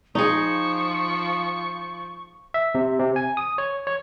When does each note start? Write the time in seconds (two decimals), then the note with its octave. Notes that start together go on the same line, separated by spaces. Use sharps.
0.15 F3 D#4 G#4 C#6
2.54 E5
2.75 C3
2.99 C3
3.16 G#5
3.37 D#6
3.58 C#5
3.87 C#5